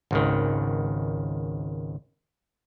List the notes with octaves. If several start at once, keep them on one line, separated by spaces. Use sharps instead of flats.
G#1 C#2 D#3